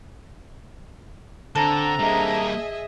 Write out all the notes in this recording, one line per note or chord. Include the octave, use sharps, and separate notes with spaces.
D3 C4 D4 A4 A#5
G3 A#3 G#4 D#5 E5